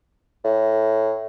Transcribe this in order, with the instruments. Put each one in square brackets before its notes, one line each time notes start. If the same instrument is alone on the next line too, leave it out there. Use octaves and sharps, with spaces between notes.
[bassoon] A2